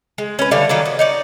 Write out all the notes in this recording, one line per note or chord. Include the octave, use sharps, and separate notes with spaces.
G#3
C#4 B4
D3 G3 A3 F5
D#3 F#3 A#3 D4
B3
D#4 C#5 D5